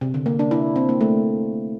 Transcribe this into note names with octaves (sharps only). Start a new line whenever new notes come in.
C3
D3
A#3
D4
E4
C4
A#3
A3